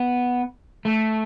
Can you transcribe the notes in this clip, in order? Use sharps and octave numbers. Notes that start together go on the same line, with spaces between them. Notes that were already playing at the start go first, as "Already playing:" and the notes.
Already playing: B3
A3